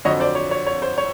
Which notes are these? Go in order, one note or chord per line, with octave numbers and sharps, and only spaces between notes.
F2 D3 F#3 C#5 D#5
C5 D5
C#5
C#5
C#5
C5
C#5